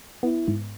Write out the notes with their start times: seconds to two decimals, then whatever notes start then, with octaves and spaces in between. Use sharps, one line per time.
0.23 B3 E4
0.48 G#2